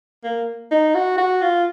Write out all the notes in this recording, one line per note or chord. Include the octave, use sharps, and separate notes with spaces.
A#3
D#4
F#4
F#4
F4